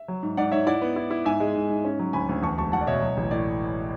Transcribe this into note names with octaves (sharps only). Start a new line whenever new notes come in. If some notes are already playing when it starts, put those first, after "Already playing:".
Already playing: E5
F#3
G#2
G#2 D5 F#5
G#2 C#5 E5
E4 D5 F#5
B3
E4
E4
G#2 E5 G#5
G#3
G#2
G#2
C#4
F#3
D2 G#5 B5
D2
E2 A5 C#6
E1 A5 C#6
E2 F#5 A5
D5
B2 C#5 E5
F#3
A1
A2 D5